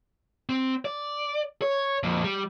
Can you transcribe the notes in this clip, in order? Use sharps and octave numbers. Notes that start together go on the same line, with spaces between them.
C4
D5
C#5
F2 A#2
G3